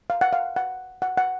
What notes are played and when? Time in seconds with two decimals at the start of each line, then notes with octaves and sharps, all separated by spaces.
0.10 F5
0.21 F#5
0.33 F5
0.56 F#5
1.02 F#5
1.18 F#5